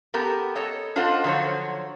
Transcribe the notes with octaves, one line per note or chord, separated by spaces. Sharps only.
B3 G4 A4 A#4
A4 C#5 D#5
D4 F4 A4 C5 D#5 F#5
D3 F3 F#3 G#4 C5 C#5